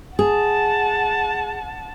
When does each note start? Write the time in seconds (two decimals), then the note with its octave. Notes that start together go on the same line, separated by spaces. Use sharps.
0.19 G#4 F#5 A5